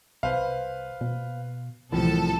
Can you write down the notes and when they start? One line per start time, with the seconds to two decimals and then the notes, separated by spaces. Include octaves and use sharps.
0.23 C2 B4 C5 F5
1.01 B2
1.92 C2 A2 E3 F3 A4 A5